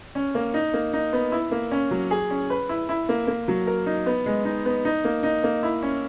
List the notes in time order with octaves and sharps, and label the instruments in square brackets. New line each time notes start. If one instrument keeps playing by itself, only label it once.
[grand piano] C#4
A#3
D#4
A#3
D#4
B3
E4
A#3
C#4
F#3
G#4
C#4
B4
E4
E4
A#3
A#3
F#3
A#4
D#4
B3
G#3
D#4
B3
D#4
A#3
D#4
A#3
E4
C#4